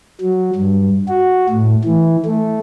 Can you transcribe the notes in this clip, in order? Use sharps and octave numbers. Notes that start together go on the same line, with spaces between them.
F#3
G2
F#4
A2
E3
A3